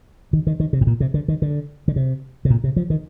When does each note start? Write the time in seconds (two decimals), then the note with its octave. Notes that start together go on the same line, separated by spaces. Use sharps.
0.33 D#3
0.47 D#3
0.60 D#3
0.73 C3
0.81 A2
0.87 A#2
1.00 C3
1.14 D3
1.28 D#3
1.42 D3
1.88 D3
1.96 C3
2.45 C3
2.50 A#2
2.64 C3
2.76 F3
2.90 D#3